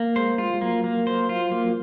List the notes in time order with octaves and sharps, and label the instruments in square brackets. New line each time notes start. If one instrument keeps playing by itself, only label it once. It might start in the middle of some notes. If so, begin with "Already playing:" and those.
Already playing: [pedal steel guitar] A#3
[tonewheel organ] G#3 [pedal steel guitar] C5
[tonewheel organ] G#3 [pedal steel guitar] F4
[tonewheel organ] G#3
[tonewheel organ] F#3 [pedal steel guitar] A#3
[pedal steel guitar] A#3
C5
F4
A#3